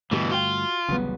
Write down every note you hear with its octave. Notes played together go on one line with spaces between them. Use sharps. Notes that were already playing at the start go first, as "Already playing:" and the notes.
G2 B2 D3 E3 A3 A#3 G4
F4 F#4 G5
A1 D2 C#3 F#3 G3 B3